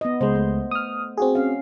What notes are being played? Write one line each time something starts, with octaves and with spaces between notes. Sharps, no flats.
B3 D#5
C#2 G#3 C5
A3
D#6 F6
C4 F#4 G#4
C#4 F5